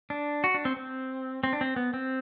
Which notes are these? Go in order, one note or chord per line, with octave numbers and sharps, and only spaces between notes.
D4
F#4
D4
C4
C4
C4
D4
C4
B3
C4